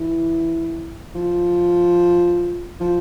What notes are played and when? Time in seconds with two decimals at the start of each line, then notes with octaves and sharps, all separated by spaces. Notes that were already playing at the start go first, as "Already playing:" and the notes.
Already playing: E3
1.15 F3
2.81 F3